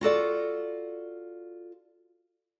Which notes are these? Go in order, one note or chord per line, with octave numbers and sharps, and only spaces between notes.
F4 F#4 A4 D5